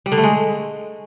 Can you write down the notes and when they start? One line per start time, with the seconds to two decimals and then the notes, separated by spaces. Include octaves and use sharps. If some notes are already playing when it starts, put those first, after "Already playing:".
0.06 G3
0.12 D3
0.18 A3
0.23 G#3